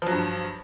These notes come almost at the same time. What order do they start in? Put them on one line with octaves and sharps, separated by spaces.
F3 F#3 G2